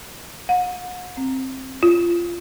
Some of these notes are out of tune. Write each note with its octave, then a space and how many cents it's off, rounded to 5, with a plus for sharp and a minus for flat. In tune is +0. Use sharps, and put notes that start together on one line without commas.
F#5 -40
C4 +15
F4 -15